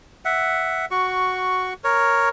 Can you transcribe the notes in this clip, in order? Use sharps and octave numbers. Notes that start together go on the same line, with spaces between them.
E5 F#5
F#4 C#6
A#4 C#5